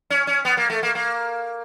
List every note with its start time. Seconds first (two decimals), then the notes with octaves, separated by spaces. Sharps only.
0.10 C#4
0.27 C#4
0.45 B3
0.57 A#3
0.70 A3
0.83 A#3
0.95 A#3